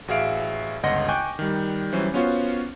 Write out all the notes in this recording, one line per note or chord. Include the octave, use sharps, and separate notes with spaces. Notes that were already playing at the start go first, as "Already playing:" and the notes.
A1 F#4 G#4 E5 F5 D7
G1 C#2 D#5 F#5 C6 A#6
G5 G#5 C#6 D6 F#6 G6
D#3 G3
E3 F#3 G3 C#4 C5
B3 C#4 F4 F#4 C5